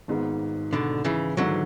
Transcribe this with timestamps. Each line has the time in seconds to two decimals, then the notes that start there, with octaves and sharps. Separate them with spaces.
0.08 G#1 G#2 G#3 B3
0.73 B2 D3
1.05 C#3 E3
1.37 G#1 G#2 D3 E3 F#3